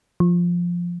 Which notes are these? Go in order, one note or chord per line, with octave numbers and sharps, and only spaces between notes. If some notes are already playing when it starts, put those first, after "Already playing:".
F3